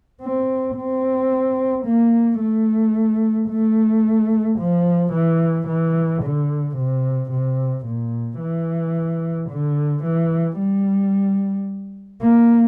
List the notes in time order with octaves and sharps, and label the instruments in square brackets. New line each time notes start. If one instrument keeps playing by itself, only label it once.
[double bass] C4
C4
A#3
A3
A3
F3
E3
E3
D3
C3
C3
A#2
E3
D3
E3
G3
A#3